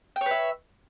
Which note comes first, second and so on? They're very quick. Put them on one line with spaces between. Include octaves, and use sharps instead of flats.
G5 C#5 B4 E5